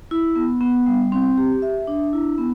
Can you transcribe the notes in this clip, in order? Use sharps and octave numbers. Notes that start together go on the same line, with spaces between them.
E4
B3
B3
G3
C4
G4
E5
D4
E4
B3